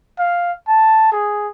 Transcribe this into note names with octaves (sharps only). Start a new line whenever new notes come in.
F5
A5
G#4